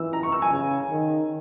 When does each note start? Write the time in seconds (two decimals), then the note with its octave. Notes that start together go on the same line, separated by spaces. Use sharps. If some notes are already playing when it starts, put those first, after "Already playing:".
Already playing: E3 E6
0.13 A#5
0.23 C#6
0.32 E6
0.42 G#5
0.52 C#3
0.90 D#3